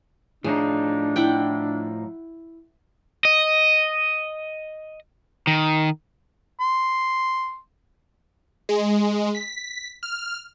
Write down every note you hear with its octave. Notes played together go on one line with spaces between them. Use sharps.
A2 F3 D4 D#4 G#4
E4 F#5 G5
D#5
D#3
C6
G#3
B6
F6